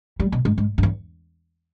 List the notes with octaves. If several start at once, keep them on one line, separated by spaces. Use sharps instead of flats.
G3
B2
G#2
G#2
G2
E2